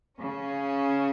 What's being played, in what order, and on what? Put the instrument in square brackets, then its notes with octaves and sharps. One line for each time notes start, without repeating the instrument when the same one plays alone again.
[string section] C#3 C#4